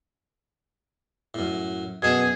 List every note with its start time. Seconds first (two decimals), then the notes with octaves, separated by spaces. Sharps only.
1.34 F#2 A2
2.02 F#2 B2 G#4 A5